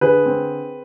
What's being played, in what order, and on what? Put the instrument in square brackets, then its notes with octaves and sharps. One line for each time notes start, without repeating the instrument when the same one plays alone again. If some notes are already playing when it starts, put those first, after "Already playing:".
[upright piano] D3 G#4 B4
C4